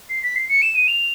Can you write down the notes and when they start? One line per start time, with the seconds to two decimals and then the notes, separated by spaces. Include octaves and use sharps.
0.10 C7
0.23 B6
0.36 C7
0.49 C#7
0.62 E7
0.75 D#7
0.88 F7